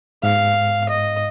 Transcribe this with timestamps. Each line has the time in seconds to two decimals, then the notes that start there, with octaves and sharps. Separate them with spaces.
0.23 G#2 F5
0.89 D#5